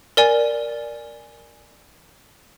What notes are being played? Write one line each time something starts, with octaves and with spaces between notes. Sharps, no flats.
A#4 D5 G#5